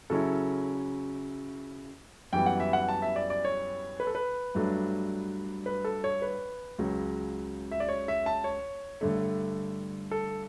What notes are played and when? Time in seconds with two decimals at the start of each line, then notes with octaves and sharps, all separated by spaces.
0.10 C#3 F#3 C#4 E4 A4
2.33 F#2 E3 G3 B3 G5
2.46 F#5
2.60 E5
2.73 F#5
2.88 A5
3.02 E5
3.16 D5
3.30 D5
3.45 C#5
4.00 B4
4.07 A4
4.15 B4
4.55 G2 F#3 A3 D4
5.66 B4
5.85 A4
6.04 C#5
6.22 B4
6.78 C#2 C#3 F#3
7.71 E5
7.80 D5
7.89 C#5
8.08 E5
8.26 A5
8.44 C#5
9.01 G2 D3 A3
10.11 A4